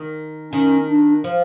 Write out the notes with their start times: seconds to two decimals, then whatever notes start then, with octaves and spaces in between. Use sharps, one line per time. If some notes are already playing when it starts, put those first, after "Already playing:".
Already playing: D#3
0.53 D#3 C#4
0.88 D4
1.24 F3